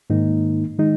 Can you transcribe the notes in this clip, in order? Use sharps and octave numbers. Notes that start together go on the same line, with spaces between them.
G#2 D#3 A#3 D#4
D#3 G#3 D#4